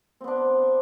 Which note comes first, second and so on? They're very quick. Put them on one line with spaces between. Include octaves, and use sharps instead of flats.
C4 B3 D4